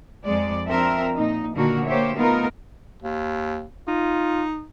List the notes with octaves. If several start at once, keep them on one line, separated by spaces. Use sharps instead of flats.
F2 G#3 D5
F3 C4 D4 A#4 E5
A#2 D#4
A#2 D3 D#3 A#3 F#4 A#4
A#3 G4 C5 C#5 E5
A3 B3 D#4 F4 A#4
D#2
D#4 F4